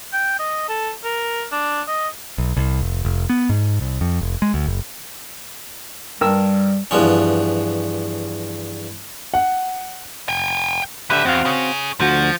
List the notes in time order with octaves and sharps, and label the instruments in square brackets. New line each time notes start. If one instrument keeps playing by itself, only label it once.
[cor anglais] G5
D#5
A4
A#4
D4
D#5
[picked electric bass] B1
C2
F1
F1
B3
G#2
C2
F2
F1
G#3
D2
F#1
[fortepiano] G2 A#4 E6 [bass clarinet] G3
[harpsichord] E2 G2 F3 C#4
[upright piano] F#5
[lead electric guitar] G5 G#5
[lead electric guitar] C#2 E5 [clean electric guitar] D3 G4 B4
[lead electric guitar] E2 [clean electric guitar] C4 F#4 F5
[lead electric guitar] C#4 G#4
[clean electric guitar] D2 F#4 [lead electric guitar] F3